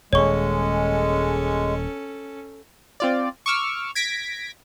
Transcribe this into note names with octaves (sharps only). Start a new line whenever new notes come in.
D#1 G#3 C#4 A4 C#5 C#6
C4 F4 D5
C#6 D6 E6 F6
G#6 A#6 B6 D7